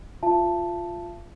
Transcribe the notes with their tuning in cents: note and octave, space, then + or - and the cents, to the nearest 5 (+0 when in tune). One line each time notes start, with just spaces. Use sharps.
F4 +0 E5 +45 A5 +0